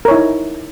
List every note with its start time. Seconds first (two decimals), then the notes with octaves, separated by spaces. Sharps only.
0.05 A#4
0.08 C#5
0.11 E4
0.14 D#4